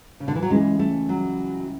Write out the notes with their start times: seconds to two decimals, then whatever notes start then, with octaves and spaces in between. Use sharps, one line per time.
0.20 C#3
0.28 D3
0.35 E3
0.42 F#3
0.50 C#2 C#3 E3 G#3
0.79 A3
1.09 F#3